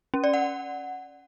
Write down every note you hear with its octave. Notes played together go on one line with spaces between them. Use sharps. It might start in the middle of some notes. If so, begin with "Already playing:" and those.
C#4
D5
F#5